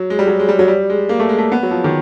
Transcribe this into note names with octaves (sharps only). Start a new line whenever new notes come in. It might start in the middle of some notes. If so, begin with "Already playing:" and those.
Already playing: F#3
G#3
G3
F#3
G#3
G3
F#3
G3
G#3
A#3
A3
G#3
A3
B3
F#3
F3
D#3